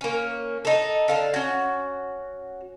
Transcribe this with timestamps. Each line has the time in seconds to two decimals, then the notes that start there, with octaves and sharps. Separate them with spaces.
0.01 A#3 C#4
0.65 D#4 A4
1.08 D3 F5 A5
1.34 C#4 F#4